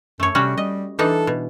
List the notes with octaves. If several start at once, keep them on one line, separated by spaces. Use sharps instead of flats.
F#2 A3 C#5
C3 G3 C#4 F#4
G3 D#5
E3 D4 D#4 A4
B2